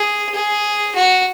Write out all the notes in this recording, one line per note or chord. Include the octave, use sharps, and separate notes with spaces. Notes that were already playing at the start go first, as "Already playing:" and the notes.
Already playing: G#4
G#4
F#4